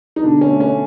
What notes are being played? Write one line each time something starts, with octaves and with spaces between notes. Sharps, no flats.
D#4
B2 D3 D4
C#4
A3
C#4